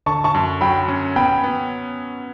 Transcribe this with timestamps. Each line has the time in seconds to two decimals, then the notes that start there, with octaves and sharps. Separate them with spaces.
0.06 D3 A5 C#6
0.24 A5 C#6
0.35 F#2
0.61 F#3 G5 B5
0.88 C#4
1.16 B3 G5 B5
1.44 B3